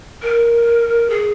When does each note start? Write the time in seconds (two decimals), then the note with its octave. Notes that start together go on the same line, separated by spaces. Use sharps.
0.22 A#4
1.10 G#4